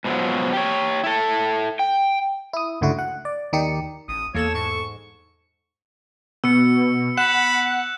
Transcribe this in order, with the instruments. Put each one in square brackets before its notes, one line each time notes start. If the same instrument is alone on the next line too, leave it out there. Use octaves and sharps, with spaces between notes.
[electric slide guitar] G#2 B2 F3 F#3
G4 C#5
E4 A4
G5
[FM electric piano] E4 D#6
G1 C#2 A2 D3 E4 F#4
F#5
D5
D#2 D#3 D#4 G4 D5 C#7
[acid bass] A1 [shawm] D#6
[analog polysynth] E2 A4 E7 [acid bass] A#3 [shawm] C#5
[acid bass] G#2 [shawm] C#6
[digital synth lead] B2 [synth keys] B3 [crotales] E6 C#7
[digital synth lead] F#5 [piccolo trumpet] B5 [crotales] F#6 E7